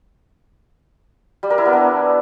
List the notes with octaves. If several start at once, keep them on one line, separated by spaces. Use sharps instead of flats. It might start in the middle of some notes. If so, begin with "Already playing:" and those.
G3
A#4
E4
B3
D4